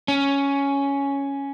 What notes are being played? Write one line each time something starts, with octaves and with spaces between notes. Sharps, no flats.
C#4